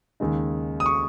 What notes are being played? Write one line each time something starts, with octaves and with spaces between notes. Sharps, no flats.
D#2 C#3 G#3 D#4
D#6
C#6